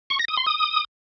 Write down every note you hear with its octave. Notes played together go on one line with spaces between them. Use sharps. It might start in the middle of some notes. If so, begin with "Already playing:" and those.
C#6
A#6
D#6
C6
D#6